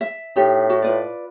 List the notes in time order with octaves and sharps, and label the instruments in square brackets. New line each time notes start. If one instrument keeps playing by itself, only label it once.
[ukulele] E5
[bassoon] A2 [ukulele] D#4 G4
[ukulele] F#4
F4 B4 D5